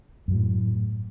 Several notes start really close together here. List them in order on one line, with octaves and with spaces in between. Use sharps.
F#2 F#3 A2